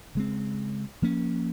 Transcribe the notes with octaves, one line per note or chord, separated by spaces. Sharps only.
C#3 G#3 C4
F3 A#3 C#4